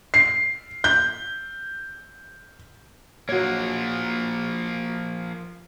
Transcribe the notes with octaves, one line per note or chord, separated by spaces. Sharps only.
C7
G6
F3 A#3 F#4 C#5